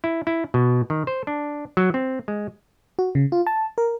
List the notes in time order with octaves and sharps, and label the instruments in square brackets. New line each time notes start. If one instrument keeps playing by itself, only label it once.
[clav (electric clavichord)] E4
E4
B2
D#3
C5
D4
F#3
C4
G#3
[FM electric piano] F#4
C#3
F4
A5
A#4